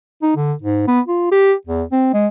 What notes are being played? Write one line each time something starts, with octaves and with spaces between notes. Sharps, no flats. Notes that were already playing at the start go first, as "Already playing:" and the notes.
D#4
D3
G#2
B3
F4
G4
E2
C4
G#3